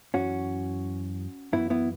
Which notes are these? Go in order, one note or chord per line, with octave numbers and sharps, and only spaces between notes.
F#2 E3 C#4 F#4
F#2 E3 B3 E4
B3 E4